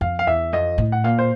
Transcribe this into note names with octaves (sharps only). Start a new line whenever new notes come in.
F2 F5
F5
E2 E5
F2 D#5
A2
F#5
A#2 F5
C5